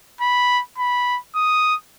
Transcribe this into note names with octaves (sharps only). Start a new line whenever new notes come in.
B5
B5
D#6